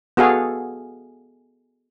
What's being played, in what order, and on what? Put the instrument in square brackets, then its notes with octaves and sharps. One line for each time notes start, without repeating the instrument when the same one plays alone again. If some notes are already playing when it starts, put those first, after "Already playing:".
[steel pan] B3 F#4 G#4 A4 F5